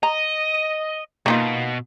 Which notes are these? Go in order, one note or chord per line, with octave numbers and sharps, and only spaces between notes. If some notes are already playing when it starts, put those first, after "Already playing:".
D#5 A#5
B2 A#3 D#4 F4